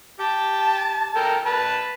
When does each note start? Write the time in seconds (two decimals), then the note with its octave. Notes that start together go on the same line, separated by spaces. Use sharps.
0.20 G4 A5
1.16 A4 A#4 G5
1.46 B4 A5